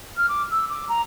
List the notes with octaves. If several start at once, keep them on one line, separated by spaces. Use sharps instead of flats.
F6
D6
E6
D6
A#5